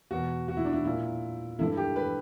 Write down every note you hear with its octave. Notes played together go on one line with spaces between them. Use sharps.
E2 B2 F#4
F#4
E4
D4
E4
A#2 E4
G2 D3 E4
G4
B4